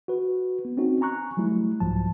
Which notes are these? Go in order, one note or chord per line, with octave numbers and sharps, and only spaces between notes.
F#4 B4
B3
C4 C#4 D#4 F#4
G#5 A#5 C#6 F#6
F#3 G3 A3 E4
C2 G#2 F3 F#3 A5